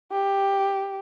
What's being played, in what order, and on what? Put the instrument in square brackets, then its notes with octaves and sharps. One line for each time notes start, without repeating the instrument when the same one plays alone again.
[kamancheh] G4